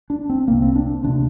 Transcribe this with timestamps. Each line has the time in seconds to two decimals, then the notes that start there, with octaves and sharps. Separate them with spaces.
0.10 D4
0.29 C4
0.48 C2 C3 A#3
0.62 C4
0.76 D4
1.04 D2 C3 D4